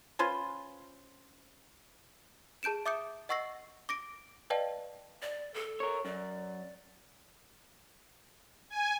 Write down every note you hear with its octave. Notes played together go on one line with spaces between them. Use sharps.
C#4 F4 B4 C5
G#4 A5 G6 D7 E7
E5 D6 D#6 G6 C#7
D#5 F#5 C#6 E6 A#6 C7
D6 A#6 D7
B4 D5 D#5 F5 G5 A5
D5
A4
A#4 C#5
F#2 D5
G#5